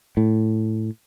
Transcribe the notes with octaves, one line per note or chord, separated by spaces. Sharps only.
A2